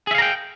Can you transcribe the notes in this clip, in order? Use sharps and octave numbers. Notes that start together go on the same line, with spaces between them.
G#4 E5 F5 G5 A#5